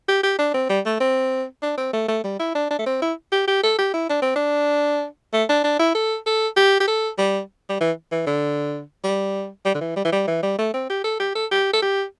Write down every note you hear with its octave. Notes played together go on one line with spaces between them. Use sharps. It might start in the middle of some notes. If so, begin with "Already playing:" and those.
G4
G4
D4
C4
G3
A3
C4
D4
C4
A3
A3
G3
E4
D4
D4
A3
C4
E4
G4
G4
A4
G4
E4
D4
C4
D4
A3
D4
D4
E4
A4
A4
G4
G4
A4
G3
G3
E3
E3
D3
G3
G3
D3
E3
G3
E3
G3
E3
G3
A3
C4
G4
A4
G4
A4
G4
A4
G4